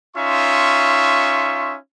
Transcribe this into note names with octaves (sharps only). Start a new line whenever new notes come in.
C#4 D#4 F4 E5 C6 C#6